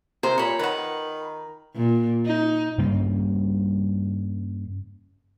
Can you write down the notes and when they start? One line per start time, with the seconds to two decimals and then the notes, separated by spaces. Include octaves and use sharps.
0.23 C3 A#4 C5
0.38 A#2 C#5 B5
0.59 D#3 B4 F#5
1.76 A#2
2.26 D#4
2.78 G2 C#3 G3 A#3